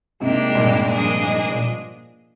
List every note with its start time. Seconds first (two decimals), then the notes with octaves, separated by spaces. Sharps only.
0.20 G#2 C3 A#3 D4 G4
0.49 G#2
0.55 G2 A#2
0.88 G2 F3 A#3 D4 G#4 D#5
1.23 G#2
1.51 A#2